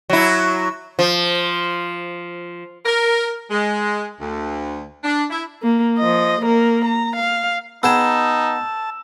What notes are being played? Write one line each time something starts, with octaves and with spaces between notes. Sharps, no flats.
F#3 E4
F3
A#4
G#3
D2
D4
E4
A#3
F3 D#5
A#3 A#4
A#5
F5
B3 D#4 G#4 G5 A5 E6 E7